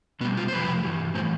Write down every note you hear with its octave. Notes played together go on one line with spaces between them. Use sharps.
B2 G3 B3
F4
C5
F2 C3 F3 B4
G2 E3 G3
A2 E3 G3 C5